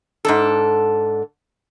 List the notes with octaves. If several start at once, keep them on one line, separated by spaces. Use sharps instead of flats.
G#2 D4 A4